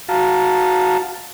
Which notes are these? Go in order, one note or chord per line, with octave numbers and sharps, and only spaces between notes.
F#4 F5 A5 A#5